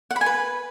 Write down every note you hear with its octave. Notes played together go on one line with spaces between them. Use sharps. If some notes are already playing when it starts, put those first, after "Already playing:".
F#5
B5
G#5
B4